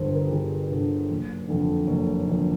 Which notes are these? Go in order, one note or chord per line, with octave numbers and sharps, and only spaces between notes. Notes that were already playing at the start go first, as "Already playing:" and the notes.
Already playing: G1 G2 D3 C5 C#5
A#4
G4
G1 G#4
G2 D3
F#1
F2 D3
F#1 C#5
F2 D3